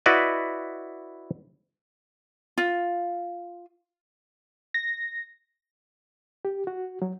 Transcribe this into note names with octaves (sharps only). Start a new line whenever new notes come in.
E4 F#4 B4 D5 D#5
F4
A#6
G4
F#4
F#3